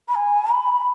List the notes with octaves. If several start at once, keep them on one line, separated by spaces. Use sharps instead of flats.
B5
G#5
B5